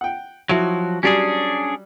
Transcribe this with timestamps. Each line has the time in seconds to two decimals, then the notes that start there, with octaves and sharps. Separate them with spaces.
0.01 F#5 G5
0.49 F3 F#3 E4 F#4
1.03 F#3 G3 C#4 D4 G#4